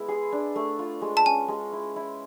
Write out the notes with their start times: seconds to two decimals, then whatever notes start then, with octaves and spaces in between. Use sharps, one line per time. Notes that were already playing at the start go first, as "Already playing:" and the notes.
Already playing: G#3 B3 E4
0.08 G#4
0.32 D4
0.56 A3
0.79 F4
1.02 G#3
1.17 A5
1.25 C#4 G#5
1.48 G#3
1.72 E4
1.96 E4